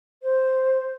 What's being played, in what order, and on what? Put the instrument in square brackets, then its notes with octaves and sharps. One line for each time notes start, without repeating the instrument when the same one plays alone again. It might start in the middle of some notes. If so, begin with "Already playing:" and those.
[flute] C5